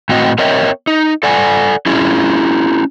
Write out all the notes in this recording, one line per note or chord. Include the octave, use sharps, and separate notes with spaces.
A2 C4 F#4 D#5 G5
C4 A#4 C#5 D#5 E5 G5
D#4
A4 D5 F#5 G#5
C#4 E4 F4 G#4